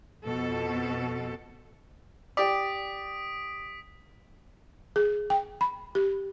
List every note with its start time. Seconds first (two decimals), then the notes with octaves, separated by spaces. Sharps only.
0.24 F2 B2 A4
2.37 G4 D5 D#6 B6 D7
4.96 G#4
5.30 G5
5.61 B5
5.95 G4